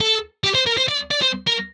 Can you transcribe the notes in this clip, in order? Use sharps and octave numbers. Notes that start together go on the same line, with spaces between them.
A4
G4
C5
A#4
C5
D5
D5
C5
A#4